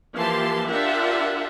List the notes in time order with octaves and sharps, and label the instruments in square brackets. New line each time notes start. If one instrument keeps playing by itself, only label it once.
[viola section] E3 F3 A#3 G4 A5 C6
D4 F4 G4 A#4 E5 F#5